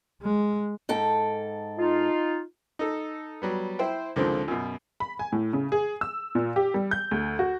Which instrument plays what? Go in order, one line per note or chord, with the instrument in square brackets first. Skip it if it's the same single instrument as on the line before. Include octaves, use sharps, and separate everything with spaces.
[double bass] G#3
[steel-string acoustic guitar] G#2 A4 G5
[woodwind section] D#4 F4
[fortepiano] D#4 A4
F#3 G3 B3
E4 C5 G5
C#2 D3 D#3 F3 C4
F#2 B2
[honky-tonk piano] B5
G#5
A2
C#3
G#4
E6
A#2
G4
G3
G6
D2
F#4